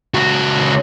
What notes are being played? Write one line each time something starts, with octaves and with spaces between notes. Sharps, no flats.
C#2 F#4